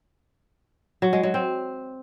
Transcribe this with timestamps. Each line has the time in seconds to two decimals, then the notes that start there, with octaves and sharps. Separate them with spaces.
1.02 F#3
1.13 G#3
1.23 F#3
1.34 C4